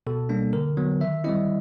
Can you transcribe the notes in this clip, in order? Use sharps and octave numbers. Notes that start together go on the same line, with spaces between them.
B2 A4
G3 A#3 D4
D3 A#4
F#3 B3
D#3 E5
G3 C4 E4 D#5